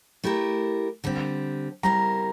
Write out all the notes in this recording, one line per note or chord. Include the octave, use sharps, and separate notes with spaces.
A3 E4 G4 A#4
D3 G3 C4
G3 C4 E4 A#4 A#5